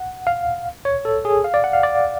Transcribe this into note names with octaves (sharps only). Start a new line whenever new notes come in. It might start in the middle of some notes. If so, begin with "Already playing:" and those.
Already playing: F#5
F5
C#5
A4
G#4
F5
D5
F#5
F5
D5